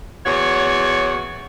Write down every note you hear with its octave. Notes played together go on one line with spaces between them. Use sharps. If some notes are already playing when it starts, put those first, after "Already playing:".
E2 F#4 C#5